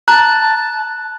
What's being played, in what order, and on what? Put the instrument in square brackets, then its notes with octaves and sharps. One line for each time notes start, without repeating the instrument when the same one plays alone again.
[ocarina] A5 [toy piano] A#5 [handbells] F#6